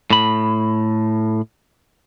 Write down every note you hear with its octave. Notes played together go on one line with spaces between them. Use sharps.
A2 B5